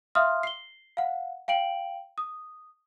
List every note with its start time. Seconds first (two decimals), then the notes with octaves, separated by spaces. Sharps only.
0.15 E5 F5 C6 D#6 F6
0.43 C7 G7
0.97 F5 F#5
1.48 F5 G5 D7 F#7
2.18 D#6